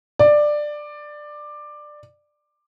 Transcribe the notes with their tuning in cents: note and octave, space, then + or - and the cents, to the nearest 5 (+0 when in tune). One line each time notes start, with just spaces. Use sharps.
D5 +15